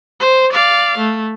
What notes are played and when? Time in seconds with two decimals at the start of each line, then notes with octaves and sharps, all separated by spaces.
0.20 C5
0.53 D5 F5
0.98 A3